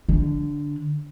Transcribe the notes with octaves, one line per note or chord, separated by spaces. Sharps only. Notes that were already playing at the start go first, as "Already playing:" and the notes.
D3